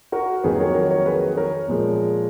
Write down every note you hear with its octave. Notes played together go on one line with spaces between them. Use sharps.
F#4 A#4
F2 D#3 F#3 A#3 G#4 B4
A#4 C#5
A#4 C#5
A#4 C#5
G#4 B4
A#4 C#5
A#2 F3 G#3